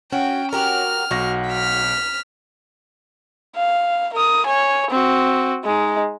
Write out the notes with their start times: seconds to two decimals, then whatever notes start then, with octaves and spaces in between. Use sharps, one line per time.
0.12 C#4 F#4 G5
0.53 F#4 G4 A#4 F6
1.11 B1 F#4 A#6
1.49 F6 B6
3.56 F5
4.13 A#4 D#6
4.46 C#5 G#5
4.90 C4 F#4
5.64 G#3 D#4